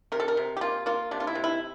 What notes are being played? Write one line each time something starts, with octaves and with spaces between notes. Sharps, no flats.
C3 A#4
A4
A#4
C3
G4
A#3 F4
A#3 F4
C3 D4
F4
E4
C3
E4